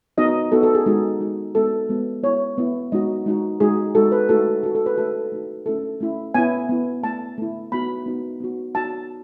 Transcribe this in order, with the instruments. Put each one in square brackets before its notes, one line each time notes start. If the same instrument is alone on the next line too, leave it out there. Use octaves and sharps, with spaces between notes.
[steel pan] B3 D#4 F#4 D#5
B3 D#4 F#4 A4
A4
G#4
G#3 D#4 F#4 G#4
G#3 D#4 F#4
G#3 B3 F#4 A4
G#3 B3 F#4
B3 E4 C#5
B3 E4
G#3 D#4 F#4 D#5
G#3 D#4 F#4
G#3 D#4 F#4 G#4
G#3 D#4 F#4 A4
B4
A3 D#4 F#4 A4
A3 D#4 F#4 A4
A4
B4
A3 D#4 F#4 A4
A3 D#4 F#4
A3 C#4 E4 A4
A3 C#4 E4
B3 E4 G#5
B3 E4
A3 E4 A5
A3 E4
B3 D#4 F#4 B5
B3 D#4 F#4
B3 D#4 F#4
B3 D#4 F#4 A5